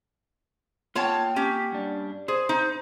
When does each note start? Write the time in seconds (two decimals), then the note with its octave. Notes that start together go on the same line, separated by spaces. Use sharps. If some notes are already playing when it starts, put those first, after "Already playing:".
0.95 A#3 F4 C#5 F#5 G5 A5
1.36 C#4 G4
1.72 G2 D4
2.28 G#4 C5
2.49 D#4